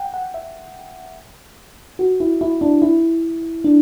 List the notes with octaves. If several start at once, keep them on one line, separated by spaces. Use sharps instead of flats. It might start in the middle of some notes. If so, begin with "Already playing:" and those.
Already playing: F#5 G5
F#5
E5
F#4
E4
E4
D4
E4
D4